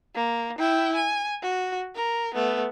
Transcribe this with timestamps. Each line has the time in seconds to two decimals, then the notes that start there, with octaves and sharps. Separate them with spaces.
0.16 A#3
0.59 E4 G5
0.95 G#5
1.43 F#4
1.96 A#4
2.34 A3 B3